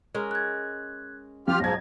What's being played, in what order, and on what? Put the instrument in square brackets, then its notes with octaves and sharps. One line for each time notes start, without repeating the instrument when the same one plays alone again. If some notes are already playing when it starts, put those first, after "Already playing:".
[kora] G#3 C#4 A#4
[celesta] F#6 G#6
[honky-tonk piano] F3 [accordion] F4 G4 F6
[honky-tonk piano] B1 G#6 [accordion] G#2 F3 [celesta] A#6